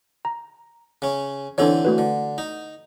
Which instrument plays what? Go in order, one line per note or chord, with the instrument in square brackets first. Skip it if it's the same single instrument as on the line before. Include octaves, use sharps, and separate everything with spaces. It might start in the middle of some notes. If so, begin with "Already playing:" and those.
[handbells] A#5
[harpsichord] C#3 C#4
[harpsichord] D3 E3 C4 [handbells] D4 A4 C#5
[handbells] A3 F#4 B4
[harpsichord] D3
D#4